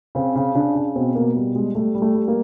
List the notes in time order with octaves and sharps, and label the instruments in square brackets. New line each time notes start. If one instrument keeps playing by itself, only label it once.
[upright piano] C#3 C4
C#3
C#3 D4
C#3
B2 C4
B2 A#3
G3
G3 G#3
G3 A3
G3
A3
G3
A#3